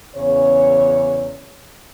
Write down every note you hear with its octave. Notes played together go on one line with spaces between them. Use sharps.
E2 C#3 C#5